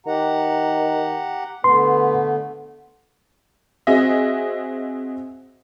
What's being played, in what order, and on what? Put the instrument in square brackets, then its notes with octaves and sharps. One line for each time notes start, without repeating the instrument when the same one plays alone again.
[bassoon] D#3 [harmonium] G4 F#5 A#5
[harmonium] D3 A3 B3 [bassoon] B4 [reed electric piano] C6
[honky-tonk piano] C4 F#4 G#4 D#5 E5